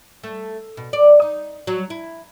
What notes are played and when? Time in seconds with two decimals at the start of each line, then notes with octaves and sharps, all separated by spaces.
0.23 A3
0.77 B2
0.93 D5
1.22 D#4
1.67 F#3
1.90 E4